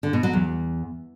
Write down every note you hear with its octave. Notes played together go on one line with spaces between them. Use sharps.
D3
B2
F#3
E2